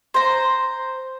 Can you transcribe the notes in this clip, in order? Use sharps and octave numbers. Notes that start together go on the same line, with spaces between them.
C5 A#5